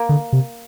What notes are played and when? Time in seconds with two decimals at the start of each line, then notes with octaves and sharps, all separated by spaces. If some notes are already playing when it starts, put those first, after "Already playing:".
Already playing: A#3
0.09 D3
0.33 C3